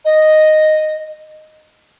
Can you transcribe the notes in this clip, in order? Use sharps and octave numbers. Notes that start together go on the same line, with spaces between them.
D#5